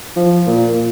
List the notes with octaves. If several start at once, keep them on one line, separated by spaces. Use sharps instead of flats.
F3
A#2